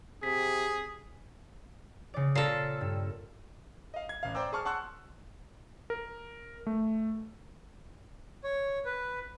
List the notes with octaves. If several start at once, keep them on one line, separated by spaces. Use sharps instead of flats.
C3 G#4 B6
C#3 D5
A#2 A4 F6 A#6 C7
G2
D#5 F5
G#6
A1 F5
C5 D5 G5 A#5 D6 E6
G#4 A5 C#6 F6
F#5 A5 C6 C#6 E6 F#6
A#4
A3
C#5
B4